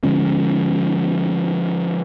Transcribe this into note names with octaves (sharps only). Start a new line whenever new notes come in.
D3 F3 G#3 C#4